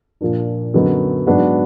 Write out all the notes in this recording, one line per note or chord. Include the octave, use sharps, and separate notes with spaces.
A#2 F3 A#3 D4
F#2 D3 F#3 B3 D#4
G#2 F#3 B3 D4 F#4